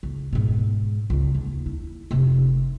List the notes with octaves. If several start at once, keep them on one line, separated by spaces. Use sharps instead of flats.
C#2
G#2 B2
C#2
D#2
E4
F1 C3